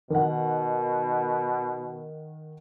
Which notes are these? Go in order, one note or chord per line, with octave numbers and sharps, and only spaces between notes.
B2 D#3 F#5